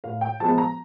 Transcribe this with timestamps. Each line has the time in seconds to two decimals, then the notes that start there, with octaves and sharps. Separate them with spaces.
0.04 A2 F5
0.21 G5
0.40 F3 G#3 B3 A5
0.58 A#5